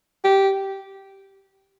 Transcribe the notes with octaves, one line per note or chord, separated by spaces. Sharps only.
G4